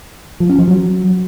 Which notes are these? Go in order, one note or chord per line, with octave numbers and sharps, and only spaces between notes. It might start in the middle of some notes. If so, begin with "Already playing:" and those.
F3
C#4
F3
F#3